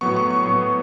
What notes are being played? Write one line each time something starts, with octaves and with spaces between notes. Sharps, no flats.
A2 F#3 B3 C#6
C#6
C#6
A2 F#3 B3